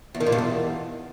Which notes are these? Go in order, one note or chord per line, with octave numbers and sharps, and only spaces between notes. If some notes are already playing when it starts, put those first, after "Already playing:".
E2
D#3
A#2
G2
E2